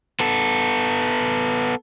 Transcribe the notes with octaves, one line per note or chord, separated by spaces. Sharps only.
B3 A4